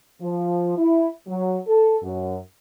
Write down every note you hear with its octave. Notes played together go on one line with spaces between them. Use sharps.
F3
E4
F#3
A4
F#2